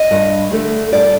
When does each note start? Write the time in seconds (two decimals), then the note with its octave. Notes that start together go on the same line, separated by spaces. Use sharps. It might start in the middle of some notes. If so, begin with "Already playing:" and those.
Already playing: D#5
0.11 G2
0.52 D3 A3
0.92 G2 D5